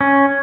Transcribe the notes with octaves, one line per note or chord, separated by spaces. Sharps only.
C#4